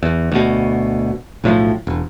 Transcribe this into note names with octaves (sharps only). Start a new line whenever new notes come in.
E2
D2 B2
B1 A2 E3 F3
E1